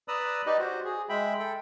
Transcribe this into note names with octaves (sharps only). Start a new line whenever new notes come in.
B4 D5 A#5 B5 D#6 E6
D#4 G4 B4 D5 D#5
F#4 C5
G#4
G#3 E5 G5 B5
A4 G5